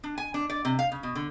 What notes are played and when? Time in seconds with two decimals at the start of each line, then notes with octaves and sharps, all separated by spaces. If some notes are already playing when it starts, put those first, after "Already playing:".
0.04 D4
0.18 G#5
0.34 D4
0.50 D5
0.65 C3
0.79 F5
0.92 C#3
1.03 B2
1.15 D3